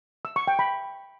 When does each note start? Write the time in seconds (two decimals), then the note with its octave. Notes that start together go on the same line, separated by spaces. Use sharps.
0.25 E6
0.36 C#6
0.47 G5
0.59 B5